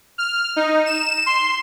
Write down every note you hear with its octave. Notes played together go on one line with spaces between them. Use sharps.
F6
D#4
E7
C6